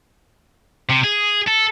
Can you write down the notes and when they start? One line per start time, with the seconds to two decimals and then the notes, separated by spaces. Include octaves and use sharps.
0.90 C3
1.04 G#4
1.47 A4